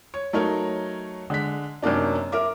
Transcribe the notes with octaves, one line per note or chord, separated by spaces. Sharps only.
C#5
F#3 A3 D#4 A#4 C#5
D3 G#3 B6
F#2 C3 A#3 D4 D#4
A#4 E5 D6